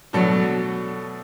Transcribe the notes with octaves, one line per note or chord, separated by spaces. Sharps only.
B2 F#3 A3 D4 A4